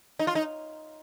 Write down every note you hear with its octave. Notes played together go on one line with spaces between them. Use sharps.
D#4
F4
D#4